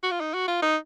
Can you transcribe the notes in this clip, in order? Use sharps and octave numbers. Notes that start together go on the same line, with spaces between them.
F#4
F4
D#4
F#4
F4
D#4